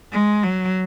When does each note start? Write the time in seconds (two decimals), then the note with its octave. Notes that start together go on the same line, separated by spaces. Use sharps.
0.12 G#3
0.44 F#3